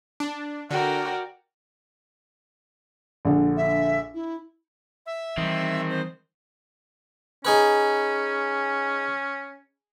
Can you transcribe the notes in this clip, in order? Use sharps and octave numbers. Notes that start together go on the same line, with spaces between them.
D4
D3 F#4 A#4 D5 G5
A#1 D3
E5
E4
E5
D#3 E3 G3 C4
C5
C#4 D#4 G#4 B4